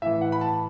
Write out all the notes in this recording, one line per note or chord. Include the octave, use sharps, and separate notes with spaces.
A2 E3 E5
F#5
B5
A5